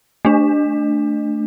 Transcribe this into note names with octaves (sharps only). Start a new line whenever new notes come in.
A3 D4